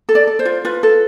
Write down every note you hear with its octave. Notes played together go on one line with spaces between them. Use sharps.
A4
D5
A4
C5
F4
F4 B4
A4